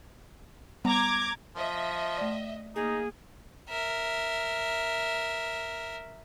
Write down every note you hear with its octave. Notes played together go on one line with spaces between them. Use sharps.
G3 B3 A#5 D6 G#6
F3 D#5 E5
A3 D5
A#3 D#4 G#4
A#4 E5